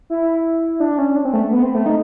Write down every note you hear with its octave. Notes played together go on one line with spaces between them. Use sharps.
E4
D4
C#4
D4
C4
A3
B3
C4
A3
D#4